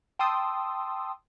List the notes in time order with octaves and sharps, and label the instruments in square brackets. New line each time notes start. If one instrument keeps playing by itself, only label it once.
[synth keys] G5 A5 C6 D#6 E6